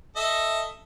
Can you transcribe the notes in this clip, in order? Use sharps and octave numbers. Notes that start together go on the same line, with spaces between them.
A4 D#5 E5